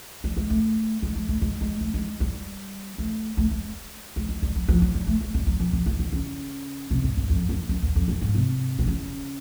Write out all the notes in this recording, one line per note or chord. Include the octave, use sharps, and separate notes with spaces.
G3
G#3
A3
G#3
G#3
A3
G#3
G#3
A3
G#3
G3
A3
A3
G#3
G#3
G#3
G3
F#3
F3
F#3
G3
A3
G#3
G3
F#3
F3
F3
D#3
D3
C#3
C3
G#2
G2
F2
F#2
F#2
E2
F2
F#2
G#2
C3
C3
C#3